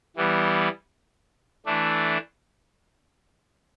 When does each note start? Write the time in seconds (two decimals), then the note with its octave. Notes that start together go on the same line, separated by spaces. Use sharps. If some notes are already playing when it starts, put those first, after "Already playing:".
0.17 E3 G3 B3
1.66 E3 A3 D4